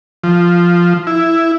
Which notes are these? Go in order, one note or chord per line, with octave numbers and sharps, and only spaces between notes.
F3
E4